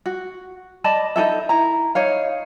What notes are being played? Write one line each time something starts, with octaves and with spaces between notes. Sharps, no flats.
F#4
D5 D#5 A5 B5
D#4 F4 A4 E5
E4 A#5
D#4 C#5 F5